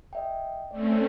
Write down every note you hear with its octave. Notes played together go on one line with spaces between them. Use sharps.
D#5 E5 G5
A3 C4 C#4 D5